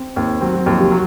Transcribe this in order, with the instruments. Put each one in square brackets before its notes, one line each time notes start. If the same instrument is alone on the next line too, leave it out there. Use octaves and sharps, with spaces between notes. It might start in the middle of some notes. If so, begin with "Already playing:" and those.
Already playing: [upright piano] C4
[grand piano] D#2 [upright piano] C4
[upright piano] F#3 [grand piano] C4
[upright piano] F#3
[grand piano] D#2 [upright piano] F3
[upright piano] C3
[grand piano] F#3